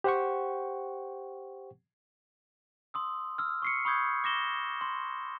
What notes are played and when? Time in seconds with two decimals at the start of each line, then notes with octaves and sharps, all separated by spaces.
0.04 G4 C5 F#5 G5 C#6
2.94 C6 D#6 E6
3.38 E6 F6
3.62 C#6 C7 C#7
3.85 B5 C#6 D#6 G6 G#6
4.24 D6 A#6 E7 G7
4.81 C6